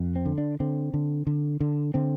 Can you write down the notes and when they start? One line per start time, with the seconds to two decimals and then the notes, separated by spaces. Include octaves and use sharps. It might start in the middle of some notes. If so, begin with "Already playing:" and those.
Already playing: F2
0.16 C4
0.26 D3
0.38 D4
0.60 D3 C4
0.94 D3
1.27 D3
1.60 D3
1.94 D3 C4